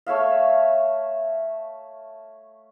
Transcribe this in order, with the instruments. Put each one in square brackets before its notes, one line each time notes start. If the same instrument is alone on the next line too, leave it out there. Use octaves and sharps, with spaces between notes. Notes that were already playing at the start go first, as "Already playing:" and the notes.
[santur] A3 C#5 E5 F5